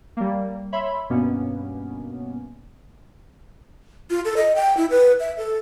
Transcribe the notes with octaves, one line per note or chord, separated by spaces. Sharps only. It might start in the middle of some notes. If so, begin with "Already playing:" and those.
G3 A#3
C#5 E5 B5 C6
G2 B2 A#3 B3 C#4
F4
A4
D#5
G5
E4
B4
E5
A4